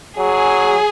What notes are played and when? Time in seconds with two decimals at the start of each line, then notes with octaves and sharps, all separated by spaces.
0.19 F#3 G#4